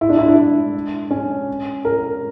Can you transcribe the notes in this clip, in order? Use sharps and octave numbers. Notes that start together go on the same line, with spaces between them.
E4
D4
E4
D4
C#4
A#4